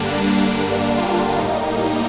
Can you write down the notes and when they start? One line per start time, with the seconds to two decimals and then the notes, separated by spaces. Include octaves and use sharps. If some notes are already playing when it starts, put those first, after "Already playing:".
Already playing: G2 D3 G3 A#3 D4
0.56 D4
0.97 F4
1.38 A2 G3 A#3 D#4